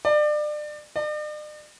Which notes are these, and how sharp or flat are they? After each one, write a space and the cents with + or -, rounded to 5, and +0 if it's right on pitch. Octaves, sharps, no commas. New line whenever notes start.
D5 +30
D5 +45